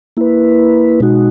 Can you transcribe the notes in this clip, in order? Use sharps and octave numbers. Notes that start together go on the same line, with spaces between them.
A#3 E4 B4
B2 G#3 D#4 F#4